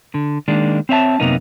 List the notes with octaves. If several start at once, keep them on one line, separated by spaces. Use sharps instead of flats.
D3
D#3 G#3 A#3 D4
C4 C#5 E5 A5
F#2 C3 A#3 B3 D#4